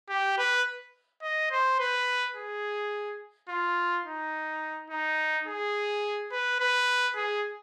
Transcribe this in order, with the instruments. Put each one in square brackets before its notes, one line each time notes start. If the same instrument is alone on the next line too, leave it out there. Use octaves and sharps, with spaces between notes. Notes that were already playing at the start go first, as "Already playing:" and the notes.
[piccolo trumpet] G4
B4
D#5
C5
B4
G#4
F4
D#4
D#4
G#4
B4
B4
G#4